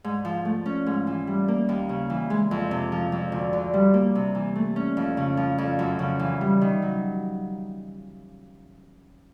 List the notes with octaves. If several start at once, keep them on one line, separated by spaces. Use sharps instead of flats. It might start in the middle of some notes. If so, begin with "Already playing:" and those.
G#2
F3
A3
C#4
G#2
E3
G3
A#3
D#2
C#3
E3
G#3
F2
C3
F3
F2
D2
D3
G3
A#3
C3
E3
A3
C#4
F2
C#3
F3
F2
F#2
C#3
E3
G3
D#3
F#3